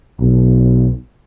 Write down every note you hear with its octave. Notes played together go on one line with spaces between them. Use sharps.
B1